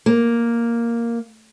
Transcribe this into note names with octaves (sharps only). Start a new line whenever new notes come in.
A#3